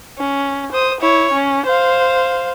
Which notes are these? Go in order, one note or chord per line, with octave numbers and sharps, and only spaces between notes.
C#4
C5 D#6
E4 C#5
C#4
C5 F5